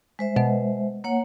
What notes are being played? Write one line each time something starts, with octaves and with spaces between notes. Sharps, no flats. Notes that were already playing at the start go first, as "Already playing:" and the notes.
G#3 C5 E5
B2
A#3 C#5 F#5